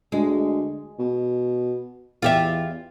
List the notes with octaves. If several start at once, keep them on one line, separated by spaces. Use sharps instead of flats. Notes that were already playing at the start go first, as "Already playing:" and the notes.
D2 G#3
B2
E2 F4 G4 E5